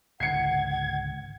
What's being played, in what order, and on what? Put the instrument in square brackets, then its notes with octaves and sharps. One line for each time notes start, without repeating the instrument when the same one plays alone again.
[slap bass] G#1 C#2 D3 [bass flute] F#5 [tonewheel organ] G#6 [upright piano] C7 C#7